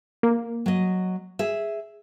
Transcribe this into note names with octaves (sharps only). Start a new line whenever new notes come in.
A#3
F#3 D#5
G#4 E5